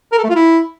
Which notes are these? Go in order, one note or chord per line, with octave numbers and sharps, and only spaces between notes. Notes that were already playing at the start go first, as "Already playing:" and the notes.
A#4
A4
A3
F4
E4